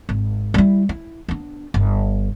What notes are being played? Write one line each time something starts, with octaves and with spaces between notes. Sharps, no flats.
G#1
G3 E4
E4
B3 D4
G1